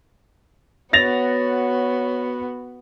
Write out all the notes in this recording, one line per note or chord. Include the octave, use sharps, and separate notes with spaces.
B3 F#4 C#5 A6 A#6 F7